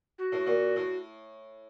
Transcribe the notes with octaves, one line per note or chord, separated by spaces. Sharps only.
F#4
A2
A#2
A2